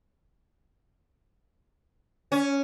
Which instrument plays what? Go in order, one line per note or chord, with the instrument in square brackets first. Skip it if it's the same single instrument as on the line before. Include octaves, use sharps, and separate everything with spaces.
[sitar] C#4